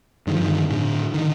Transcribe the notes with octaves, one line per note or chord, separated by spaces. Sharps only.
G2 D3 D#3
F3
D#3
A2 D3
D3 D#3